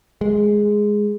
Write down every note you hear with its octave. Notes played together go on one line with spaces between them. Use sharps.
G#3